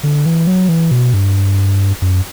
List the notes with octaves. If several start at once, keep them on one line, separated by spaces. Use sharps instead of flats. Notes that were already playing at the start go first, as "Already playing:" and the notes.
D3
E3
F#3
E3
B2
G2
F#2